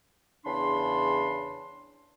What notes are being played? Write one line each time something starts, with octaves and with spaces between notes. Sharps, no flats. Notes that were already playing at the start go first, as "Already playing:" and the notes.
E2 C#3 D4 B5 C6